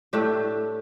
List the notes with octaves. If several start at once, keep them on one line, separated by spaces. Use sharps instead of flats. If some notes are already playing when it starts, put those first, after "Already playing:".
A2 A3 D4 G4